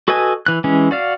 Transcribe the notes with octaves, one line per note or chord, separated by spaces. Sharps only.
F#4 A4 B4 D#5 G#5
E3 F#6
E3 G#3 C#4
F#4 D5 F5